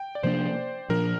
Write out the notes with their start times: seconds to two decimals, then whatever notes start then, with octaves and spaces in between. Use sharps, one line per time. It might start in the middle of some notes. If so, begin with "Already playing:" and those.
Already playing: G5
0.15 D5
0.23 C3 F3 A#3 D4 C5
0.89 A#2 F3 D4 A#4